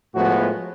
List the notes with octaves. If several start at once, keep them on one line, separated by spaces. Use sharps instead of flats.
A2 F3 G#3 B3 F#4